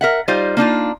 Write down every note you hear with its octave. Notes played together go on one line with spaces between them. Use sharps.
A#4 E5 F#5
G3 D#4 F4 C5 F5
A#3 D4 D#4 F4